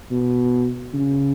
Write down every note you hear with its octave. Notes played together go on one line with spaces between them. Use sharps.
B2
C#3